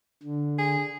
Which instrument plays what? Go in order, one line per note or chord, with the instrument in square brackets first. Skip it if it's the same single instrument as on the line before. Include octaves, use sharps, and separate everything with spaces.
[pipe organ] D3
[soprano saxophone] G#4